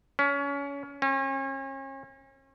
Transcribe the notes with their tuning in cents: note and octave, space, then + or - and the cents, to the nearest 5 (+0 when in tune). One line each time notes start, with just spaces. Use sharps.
C#4 +25
C#4 -40